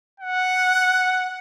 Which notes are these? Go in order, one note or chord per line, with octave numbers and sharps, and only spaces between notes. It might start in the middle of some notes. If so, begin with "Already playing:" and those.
F#5